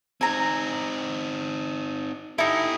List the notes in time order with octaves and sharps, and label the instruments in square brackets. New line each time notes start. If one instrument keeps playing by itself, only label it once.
[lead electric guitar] C4 D#4 [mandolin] G#5 A#5
[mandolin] D#4 E4 [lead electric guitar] G4 A4